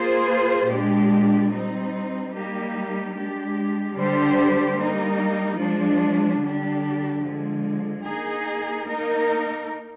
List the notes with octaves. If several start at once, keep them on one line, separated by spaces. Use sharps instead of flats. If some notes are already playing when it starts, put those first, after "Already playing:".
Already playing: A#3 F4 G#4 C5
A#2 G#3 D4 G4
G3 C4 D#4
G3 A#3 D#4 G4
G#3 D4 G4
D3 G3 D4 G4 C5
G3 A#3 D#4
F3 G#3 D4
D3 G3 D4 G4
D3 F3 G#3
A#3 D#4 G#4
A#3 D#4 A#4